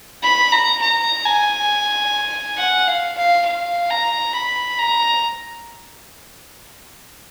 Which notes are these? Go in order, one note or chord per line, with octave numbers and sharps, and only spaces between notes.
B5
A#5
A#5
G#5
F#5
F5
F5
F5
A#5
B5
A#5